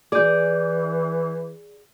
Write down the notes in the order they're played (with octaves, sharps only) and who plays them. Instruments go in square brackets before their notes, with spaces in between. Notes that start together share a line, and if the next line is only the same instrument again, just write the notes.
[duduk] E3 [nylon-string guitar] G#4 D5 [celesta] D6 G6